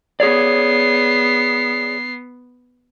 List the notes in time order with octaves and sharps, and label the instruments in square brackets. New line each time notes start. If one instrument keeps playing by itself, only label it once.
[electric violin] B3 C7 [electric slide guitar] G#4 C#5 D5